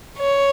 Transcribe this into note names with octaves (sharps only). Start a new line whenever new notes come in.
C#5